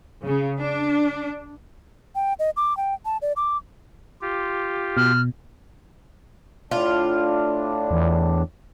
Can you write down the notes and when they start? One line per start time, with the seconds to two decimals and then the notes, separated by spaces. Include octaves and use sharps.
0.22 C#3
0.59 D4
2.15 G5
2.39 D#5
2.57 D6
2.77 G5
3.05 A5
3.22 D5
3.36 D6
4.22 F4 G4
4.97 B2 F6
6.71 A2 D4 F4
7.91 E2